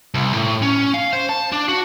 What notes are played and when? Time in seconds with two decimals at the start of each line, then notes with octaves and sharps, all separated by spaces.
0.14 C2
0.34 A2
0.62 C#4
0.94 F5
1.13 C5
1.29 A5
1.52 D4
1.68 F#4